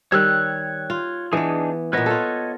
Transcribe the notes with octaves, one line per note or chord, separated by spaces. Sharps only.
D#3 G3 C#5 E6 F#6
F4
E3 B3 D4 D#4 G#4
A#2 B3 B4 C#5 D#5
F4 A4